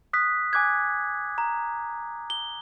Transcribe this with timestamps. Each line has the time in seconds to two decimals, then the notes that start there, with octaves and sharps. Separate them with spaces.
0.13 D#6 F#6 B6
0.53 G#5 D6 F#6 G#6
1.38 A#5
2.30 G7